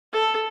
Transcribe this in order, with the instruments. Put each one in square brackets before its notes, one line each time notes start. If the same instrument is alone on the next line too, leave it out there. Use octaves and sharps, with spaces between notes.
[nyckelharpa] A4